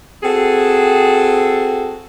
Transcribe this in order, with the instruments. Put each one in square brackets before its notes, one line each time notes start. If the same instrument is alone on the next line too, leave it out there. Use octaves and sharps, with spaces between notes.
[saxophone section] C4 F#4 G#4 A4